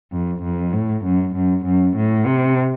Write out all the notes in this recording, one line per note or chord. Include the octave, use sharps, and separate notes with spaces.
F2
F2
A2
F#2
F#2
F#2
A2
C3